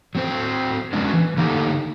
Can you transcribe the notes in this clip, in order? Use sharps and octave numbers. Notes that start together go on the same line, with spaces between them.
F#3 C4 C5
F#3 G#3 B3 C#4 D4
E3
D3 A3 A#3 D#4 G4